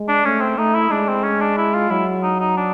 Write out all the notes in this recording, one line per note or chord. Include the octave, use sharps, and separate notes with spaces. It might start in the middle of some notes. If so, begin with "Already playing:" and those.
Already playing: G#3
D4
A3 C#4
C4
A3 D#4
E4
G#3 D4
C4
C#4
D4
E4
F4
F#3 E4
D#4
D#4
D4